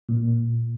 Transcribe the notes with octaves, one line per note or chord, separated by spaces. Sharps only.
A#2